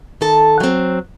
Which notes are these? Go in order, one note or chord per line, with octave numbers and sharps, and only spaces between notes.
D#3 A4 A5
F#3 C4